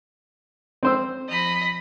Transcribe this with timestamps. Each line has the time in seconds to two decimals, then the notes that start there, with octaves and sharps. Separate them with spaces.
0.83 C4 C5 E6
1.30 F3 D#5 B5